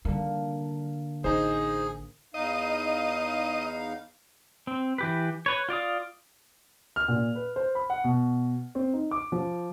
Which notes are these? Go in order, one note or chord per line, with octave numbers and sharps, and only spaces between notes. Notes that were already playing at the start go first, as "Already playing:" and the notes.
D3 D#3 G3 A#3
A1 D#4 G#4 C5
E2 D#4 D#5 F5
C4
E3 G4 B4
B4 C#5
F4 D5 F5 D#6
F6
A#2
B4
C5
B5
F#5
B2
C4
D#4
D6
F3